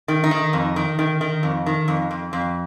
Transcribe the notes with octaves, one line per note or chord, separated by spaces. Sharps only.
D#3
D#4
D#3
F2
D#3
D#3
D#3
F2
D#3
F2
F2
F2